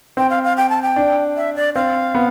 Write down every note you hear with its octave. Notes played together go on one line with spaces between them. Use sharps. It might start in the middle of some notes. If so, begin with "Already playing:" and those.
C4 G5
F5
F5
G5
A5
G5
D4
E5
D5
C4 F5
B3